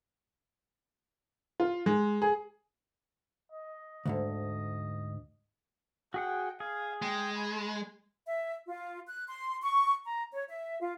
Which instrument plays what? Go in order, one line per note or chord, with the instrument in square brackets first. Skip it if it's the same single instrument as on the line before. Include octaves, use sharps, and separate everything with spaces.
[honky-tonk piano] F4
G#3
G#4
[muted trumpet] D#5
[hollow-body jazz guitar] D2 G#2 D3
[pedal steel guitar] F#4 G#4 F#5 [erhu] G5
[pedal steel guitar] G#4 [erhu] F5
[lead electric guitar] G#3 [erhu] G5
[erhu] B5
[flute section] E5
F4
F#6
C6
C#6
A#5
C#5
E5
F4